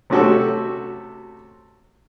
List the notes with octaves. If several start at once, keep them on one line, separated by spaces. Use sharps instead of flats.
C3 A3 C#4 F#4 G4 A4